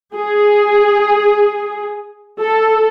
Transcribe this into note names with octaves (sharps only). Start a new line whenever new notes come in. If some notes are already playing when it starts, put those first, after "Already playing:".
G#4
A4